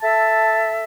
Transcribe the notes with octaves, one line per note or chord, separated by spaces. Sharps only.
A4 E5 A5